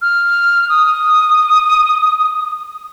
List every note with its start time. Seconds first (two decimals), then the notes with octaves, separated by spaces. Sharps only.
0.02 F6
0.69 D#6